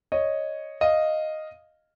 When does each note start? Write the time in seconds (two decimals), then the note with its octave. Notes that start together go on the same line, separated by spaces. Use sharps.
0.12 C#5 D#5
0.81 D#5 F5